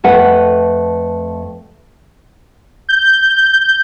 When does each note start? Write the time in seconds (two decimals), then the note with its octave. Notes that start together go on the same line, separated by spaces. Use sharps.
0.04 F2 A3 B4 F#5
2.89 G6